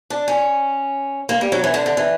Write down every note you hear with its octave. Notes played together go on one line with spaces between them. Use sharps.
D4
C#4
A#3
G3
F#3
E3
D3
D3
E3